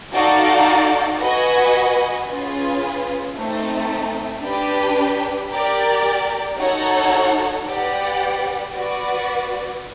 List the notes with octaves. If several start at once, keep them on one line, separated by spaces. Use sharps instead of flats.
D#4 F#4 A4 D5 F5
F#4 B4 D#5 G#5
C#4 F4 G#4 B4
A3 C4 D#4
D4 G4 B4
G4 A#4 D5
D#4 F#4 A4 C#5 F#5
G4 B4 D5 F#5
F#4 B4 D5